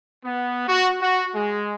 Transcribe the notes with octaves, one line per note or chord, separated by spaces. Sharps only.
B3
F#4
F#4
G#3